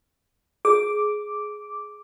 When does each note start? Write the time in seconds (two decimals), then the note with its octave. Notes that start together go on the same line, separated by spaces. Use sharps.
0.65 G#4 D6